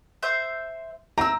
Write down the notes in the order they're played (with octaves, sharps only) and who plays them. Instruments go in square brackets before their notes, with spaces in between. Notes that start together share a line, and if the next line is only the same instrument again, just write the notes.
[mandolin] C5 E5 G6
[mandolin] C4 E6 [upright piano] A#5